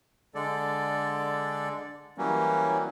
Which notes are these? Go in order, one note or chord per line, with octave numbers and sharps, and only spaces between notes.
D3 G#3 A4 D5
E3 F#3 G3 A#3 C#4